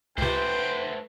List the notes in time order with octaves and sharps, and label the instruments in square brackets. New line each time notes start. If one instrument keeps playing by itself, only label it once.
[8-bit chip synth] C#2 C3 [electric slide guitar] A3 C5 [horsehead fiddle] B4 [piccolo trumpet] G5